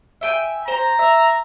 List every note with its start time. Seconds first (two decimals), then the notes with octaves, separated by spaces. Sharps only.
0.21 E5 G5 G#5
0.68 C5 A#5
0.99 E5